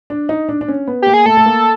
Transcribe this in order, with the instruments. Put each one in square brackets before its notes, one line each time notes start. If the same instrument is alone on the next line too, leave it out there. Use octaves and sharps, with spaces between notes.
[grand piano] D4
D#4
D4
D4
C#4
B3
[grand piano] A#3 [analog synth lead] G4
[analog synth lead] G#4
[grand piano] A3 [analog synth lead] A4
[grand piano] A3
A#3